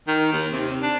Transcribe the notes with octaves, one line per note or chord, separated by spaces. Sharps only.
D#3
D#2
C3
D4